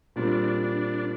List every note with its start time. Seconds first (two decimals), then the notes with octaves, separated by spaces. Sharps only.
0.16 A#2 G3 C4 D4
0.63 D4